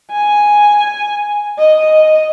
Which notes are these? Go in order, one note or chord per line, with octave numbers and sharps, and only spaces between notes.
G#5
D#5